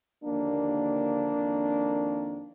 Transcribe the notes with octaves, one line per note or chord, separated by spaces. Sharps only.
D#2 D3 F3 A#3 D4
F2 D#3